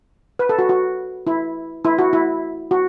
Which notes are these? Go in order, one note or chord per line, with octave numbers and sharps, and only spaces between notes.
B4
A4
F#4
F#4
E4
E4
F#4
E4
F#4